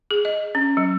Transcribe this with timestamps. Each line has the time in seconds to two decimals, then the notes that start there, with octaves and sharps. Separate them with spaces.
0.11 G#4
0.25 D#5
0.55 C#4
0.77 F#3